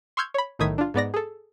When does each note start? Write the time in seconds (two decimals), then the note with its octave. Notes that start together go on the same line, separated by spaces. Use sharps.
0.17 C6 C#6 E6 F6 G6 G#6
0.34 C#5 B5
0.59 B1 A2 D#3 D#6 G#6 B6
0.78 D4 F4
0.94 G#2 B3 D5 A#6
1.14 G#4 A4